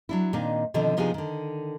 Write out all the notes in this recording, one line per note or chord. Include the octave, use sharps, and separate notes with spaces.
F#3 D4 E4
A#2 D#3 C4 D4 D#4
B2 D3 D#3 F3 C4 D#4
C3 F3 B3 D4 D#4 G#4
D3 D#3